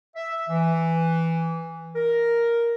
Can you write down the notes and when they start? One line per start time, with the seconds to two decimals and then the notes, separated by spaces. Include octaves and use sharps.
0.16 E5
0.49 E3
1.96 A#4